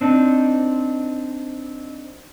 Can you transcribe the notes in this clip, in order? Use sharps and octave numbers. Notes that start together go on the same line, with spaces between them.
C4 D4 D#4